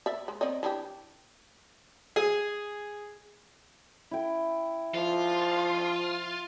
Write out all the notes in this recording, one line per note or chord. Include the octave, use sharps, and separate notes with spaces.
D5 E5
G#3
C4 D5 D#5
E3 D4 G4
G#4
E4 G5
F3 F4